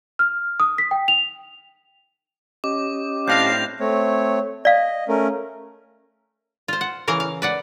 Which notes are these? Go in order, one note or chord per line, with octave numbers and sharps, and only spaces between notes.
F6
D#6
B6
G5
F7
C#4 G4 D#5 D6
A2 C4 D4 F5 G6 A#6 F7
A3 C4 C#5
D5 D#5 F5
A3 C#4 A#4
F4 C5
F#5
C#3 E3 A#4 F5
F5
B4 D5 F#5